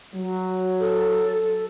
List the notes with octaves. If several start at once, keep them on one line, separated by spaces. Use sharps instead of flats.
F#3
A4